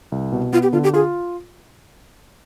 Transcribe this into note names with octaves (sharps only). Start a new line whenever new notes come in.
C2
B2
B3 F4
G4
D3 F4
G4
F4 G#4